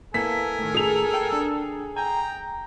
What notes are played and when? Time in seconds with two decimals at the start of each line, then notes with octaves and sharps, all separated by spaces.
0.14 A#3 B3 E4 A4 A#4 G#5 B6
0.59 A2 D#3
0.75 G#4 F7
1.14 G5
1.33 D4
1.97 G5 G#5 A#5